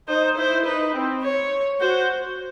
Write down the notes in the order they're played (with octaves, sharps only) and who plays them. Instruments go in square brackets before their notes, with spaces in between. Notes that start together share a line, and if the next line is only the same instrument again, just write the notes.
[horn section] D#4 [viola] C5
[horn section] E4 [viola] C5
[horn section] D#4 [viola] B4
[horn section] C4
[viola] C#5
[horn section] F#4 [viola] C5